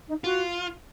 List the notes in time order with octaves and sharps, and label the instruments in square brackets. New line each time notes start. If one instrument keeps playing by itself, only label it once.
[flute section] D#4
[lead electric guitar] F4 [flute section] F#4